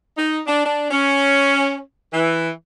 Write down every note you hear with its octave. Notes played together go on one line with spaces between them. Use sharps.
D#4
D4
D4
C#4
E3